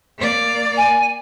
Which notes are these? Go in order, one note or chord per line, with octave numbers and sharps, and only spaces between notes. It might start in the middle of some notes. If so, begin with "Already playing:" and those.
A#3 D5
G#5